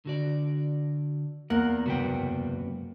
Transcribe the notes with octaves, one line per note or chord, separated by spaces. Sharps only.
D3 F#4 D5
E2 A#3 A#4 F#5
C#2 F#2 C3 F#4 B4 G5